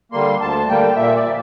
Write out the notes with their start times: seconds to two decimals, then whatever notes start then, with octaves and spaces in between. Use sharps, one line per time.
0.12 D3 G3 A#3 C6
0.40 D2 A5
0.69 D3 G3 A#3 G5
0.96 A#2 E5
1.15 D5
1.25 F3 A#3